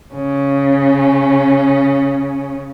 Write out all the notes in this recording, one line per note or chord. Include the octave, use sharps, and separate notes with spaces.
C#3 C#4